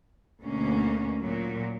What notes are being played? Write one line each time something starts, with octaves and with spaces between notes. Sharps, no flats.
D2 B2 A#3 C#4
A#2 F#3